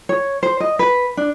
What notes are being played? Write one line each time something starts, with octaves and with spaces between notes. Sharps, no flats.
C#5
C5
D#5
B4
D4